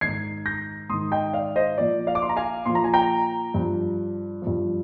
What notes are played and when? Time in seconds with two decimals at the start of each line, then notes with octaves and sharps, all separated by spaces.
0.01 G#2 D#3 G#6 C7
0.46 G6 A#6
0.90 G#2 D#3 C6 D#6
1.12 D#5 G5
1.33 D5 F5
1.56 C5 D#5
1.78 A#2 F3 D5
2.07 D5 F5
2.15 D6
2.22 C6
2.29 A#5
2.36 F5 G#5
2.66 A#2 F3 C6
2.75 A#5
2.84 G#5
2.93 G5 A#5
3.54 G2 F3
4.42 G2 F3